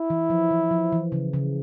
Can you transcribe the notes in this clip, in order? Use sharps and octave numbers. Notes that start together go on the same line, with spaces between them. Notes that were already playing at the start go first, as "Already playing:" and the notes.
Already playing: E4
E3
F3
E3
F3
E3
C#3
C#3